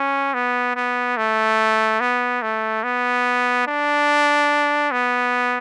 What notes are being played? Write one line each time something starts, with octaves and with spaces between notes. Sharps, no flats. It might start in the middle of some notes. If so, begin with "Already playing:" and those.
Already playing: C#4
B3
B3
A3
B3
A3
B3
D4
B3